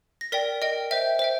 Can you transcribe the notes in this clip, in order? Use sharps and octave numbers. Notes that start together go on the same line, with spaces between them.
A#6
A#4 D5 G5 B6
A#4 D#5 G5
C5 E5 G5
C5 E5 G5